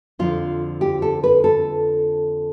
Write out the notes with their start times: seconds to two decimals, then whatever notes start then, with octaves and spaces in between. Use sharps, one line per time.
0.19 F2 D3 F3 F4
0.81 G4
1.02 A4
1.24 B4
1.44 A4